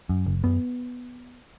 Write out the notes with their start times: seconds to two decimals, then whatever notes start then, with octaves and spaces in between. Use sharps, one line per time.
0.09 F#2
0.26 F#1
0.44 F#2 B3